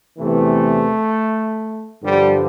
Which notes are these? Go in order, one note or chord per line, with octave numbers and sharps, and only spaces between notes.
E2 C3 E3 A3
G2 D3 F3 G3